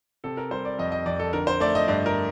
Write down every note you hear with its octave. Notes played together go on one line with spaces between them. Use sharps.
C3 A4
A#4
G3 C5
D5
F2 D#5
D#5
F2 D5
A4
D3 A#4
C5
A3 D5
D#5
G2 D5
A#4